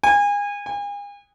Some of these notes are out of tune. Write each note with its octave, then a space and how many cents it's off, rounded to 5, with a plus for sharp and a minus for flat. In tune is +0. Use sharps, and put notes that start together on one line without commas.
G#5 -30
G#5 -40